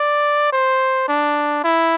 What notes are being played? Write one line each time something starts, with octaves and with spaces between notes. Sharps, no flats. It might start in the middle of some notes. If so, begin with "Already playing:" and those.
Already playing: D5
C5
D4
E4